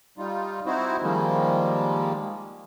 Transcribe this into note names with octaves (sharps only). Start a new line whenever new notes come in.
G3 D#4 F4
C4 D#4 E4 F#4 C5
D#3 F3 G3 G#3 A#3